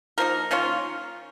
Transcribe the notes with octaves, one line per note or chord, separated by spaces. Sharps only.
F3 A#3 D#4 A#4
D#3 A#3 C#4 F4